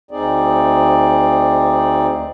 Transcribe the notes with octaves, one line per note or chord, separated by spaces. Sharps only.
D2 C4 D#4 G#4 D5